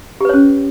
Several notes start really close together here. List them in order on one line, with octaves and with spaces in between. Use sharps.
G4 B4 C#5 C#4